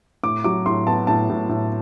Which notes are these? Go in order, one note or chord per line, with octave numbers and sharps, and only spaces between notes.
A2 D6
F#3 D6
A2 C6
B3 A5
A2 A5
A2
A2